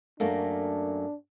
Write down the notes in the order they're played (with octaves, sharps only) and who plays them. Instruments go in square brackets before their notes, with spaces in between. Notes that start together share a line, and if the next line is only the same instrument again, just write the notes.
[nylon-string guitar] F#2 A3 A#3 [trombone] D4